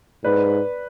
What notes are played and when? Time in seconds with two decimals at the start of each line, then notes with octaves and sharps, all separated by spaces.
0.24 G#2 B4 D5